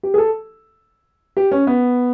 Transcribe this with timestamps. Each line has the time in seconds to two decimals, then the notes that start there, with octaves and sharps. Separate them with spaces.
0.03 G4
0.14 G#4
0.18 A4
1.37 G4
1.52 C#4
1.67 B3